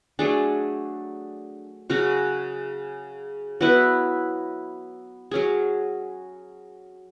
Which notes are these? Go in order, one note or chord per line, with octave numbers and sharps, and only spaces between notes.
F#3 A3 D4 G#4
C#3 F#3 C#4 F#4
F#3 B3 E4 B4
F#3 C#4 G#4